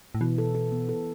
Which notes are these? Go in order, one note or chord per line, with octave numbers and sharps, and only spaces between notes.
A2
B2 E3
A4
A4
B3
A4